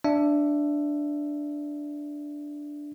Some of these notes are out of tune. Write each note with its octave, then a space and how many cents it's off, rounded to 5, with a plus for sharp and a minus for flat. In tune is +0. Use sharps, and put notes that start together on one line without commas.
D4 +0 E5 +15